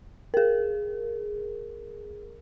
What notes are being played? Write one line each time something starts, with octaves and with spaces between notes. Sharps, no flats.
G#4 A#4